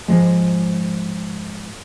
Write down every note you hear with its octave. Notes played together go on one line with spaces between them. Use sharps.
G#2 F3 G#3